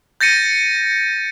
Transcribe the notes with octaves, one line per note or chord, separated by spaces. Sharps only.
G6 A6 A#6 C#7 D#7